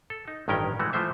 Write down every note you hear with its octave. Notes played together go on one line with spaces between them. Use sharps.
A4
D#4
A1 G2 D#3 C#4 A#4 G5
E3 G#3 A3 F#4
E3 F3 A3 C5 E5